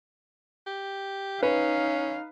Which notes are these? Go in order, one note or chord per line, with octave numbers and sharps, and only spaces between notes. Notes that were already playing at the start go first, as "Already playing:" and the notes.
G4
C#4 D#4 B4 F5